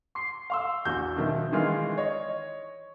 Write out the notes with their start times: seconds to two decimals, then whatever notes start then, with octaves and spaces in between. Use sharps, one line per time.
0.15 C6 C7
0.50 F5 C6 E6
0.85 A#1 E2 F#4 C#6 G6
1.16 B2 D#3 F3 E5
1.52 D#3 E3 G#3 F4
1.98 C#5 D#5